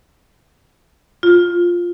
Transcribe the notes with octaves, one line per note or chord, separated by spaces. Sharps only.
F4